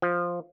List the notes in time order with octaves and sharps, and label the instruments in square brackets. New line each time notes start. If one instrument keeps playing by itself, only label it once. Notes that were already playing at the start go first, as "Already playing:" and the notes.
[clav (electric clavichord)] F3